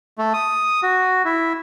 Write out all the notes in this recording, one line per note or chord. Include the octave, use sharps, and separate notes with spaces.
A3
D#6
F#4
E4